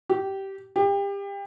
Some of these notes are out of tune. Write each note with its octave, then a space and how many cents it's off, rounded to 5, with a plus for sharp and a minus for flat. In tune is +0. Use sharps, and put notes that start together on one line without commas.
G4 -15
G4 +30